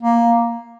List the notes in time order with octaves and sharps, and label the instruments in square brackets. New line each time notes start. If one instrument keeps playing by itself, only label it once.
[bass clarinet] A#3